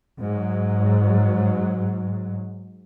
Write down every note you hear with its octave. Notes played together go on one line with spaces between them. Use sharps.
G#2 F#3